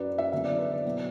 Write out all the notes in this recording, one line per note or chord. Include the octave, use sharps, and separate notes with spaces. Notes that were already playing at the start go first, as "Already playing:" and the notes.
Already playing: F#2 F#3 B4 D5
E5
E2 D3 F#3 E5
D5
B4
D5
B2 F#3